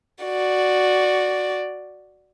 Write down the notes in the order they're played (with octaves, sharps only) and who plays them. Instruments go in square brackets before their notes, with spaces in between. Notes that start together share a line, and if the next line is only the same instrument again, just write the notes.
[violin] F#4 D5